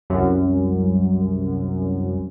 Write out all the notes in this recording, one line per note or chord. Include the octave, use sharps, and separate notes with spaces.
C2 F#2